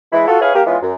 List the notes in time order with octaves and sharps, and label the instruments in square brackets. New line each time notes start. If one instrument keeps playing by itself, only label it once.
[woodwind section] E3 G#3 E4
F4 F#4 A4
E4 G#4 B4 C#5 F5 G#5
A#3 G4 A#4
E3 G#3 B3 C#4 F4
F#2